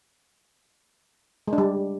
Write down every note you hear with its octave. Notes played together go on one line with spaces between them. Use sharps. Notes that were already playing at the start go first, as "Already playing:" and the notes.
G#3
D4
G3